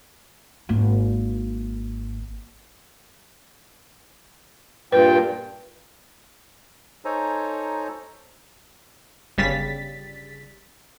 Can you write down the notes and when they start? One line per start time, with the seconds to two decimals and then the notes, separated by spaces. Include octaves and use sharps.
0.69 G#1 A#3
4.92 G2 A#2 B4 G5
7.05 D#4 A4 C5 C#5 G#5 A#5
9.38 G1 C#3 G3 A6 B6